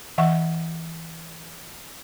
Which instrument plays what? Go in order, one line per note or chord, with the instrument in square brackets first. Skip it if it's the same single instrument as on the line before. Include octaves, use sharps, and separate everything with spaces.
[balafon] E3 E5 F#5 C#6